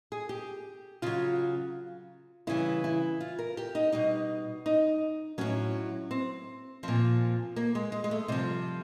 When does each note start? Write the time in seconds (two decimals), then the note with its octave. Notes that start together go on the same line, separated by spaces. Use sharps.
0.12 G#4
0.29 G4
1.02 C#3 F#3 F4
2.47 C#3 E3 G3 E4
2.84 E4
3.21 F4
3.39 A#4
3.57 G4
3.75 D#4
3.92 B2 G3 D#4
4.66 D#4
5.38 A2 F#3 C#4
6.11 C4
6.83 A#2 F3 C4
7.56 A#3
7.75 G#3
7.92 G#3
8.04 G#3
8.11 A3
8.28 C3 F3 G3